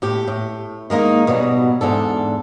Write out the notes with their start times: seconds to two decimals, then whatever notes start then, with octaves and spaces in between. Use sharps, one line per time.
0.02 A2 G4
0.28 A2
0.90 D#3 G#3 A#3 D#4
1.27 B2 F#3 G3
1.81 E2 G#2 D4 A4